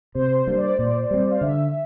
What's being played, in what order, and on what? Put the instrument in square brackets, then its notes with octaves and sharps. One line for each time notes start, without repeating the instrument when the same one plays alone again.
[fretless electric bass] C3 [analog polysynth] C5
[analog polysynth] C5
[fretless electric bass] G3 A#3 D4
[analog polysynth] D5
[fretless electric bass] A#2 [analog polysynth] D5
[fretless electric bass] G3 C4
[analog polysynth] F5
[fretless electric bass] D3 [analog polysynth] E5